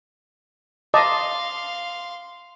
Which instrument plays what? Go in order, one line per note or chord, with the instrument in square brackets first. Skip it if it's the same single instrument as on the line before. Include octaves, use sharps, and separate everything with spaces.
[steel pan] D#5 A5 [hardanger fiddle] F5 C6 [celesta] D6